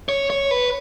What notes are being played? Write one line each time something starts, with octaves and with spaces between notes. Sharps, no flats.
C#5
C#5
B4